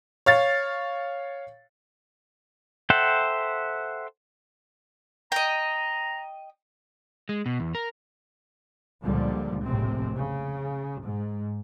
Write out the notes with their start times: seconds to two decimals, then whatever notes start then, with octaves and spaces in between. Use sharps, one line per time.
0.26 C#5 F5 A6
2.90 A4 C5 E5 F#5 G5
5.32 D#5 G5 A#5
7.29 G#3
7.46 B2
7.60 E2
7.75 A#4
9.04 C#2 A#2 D3 F3 G3
9.64 F1 A#1 A2 C3 G#3 C4
10.16 C#3
11.04 G#2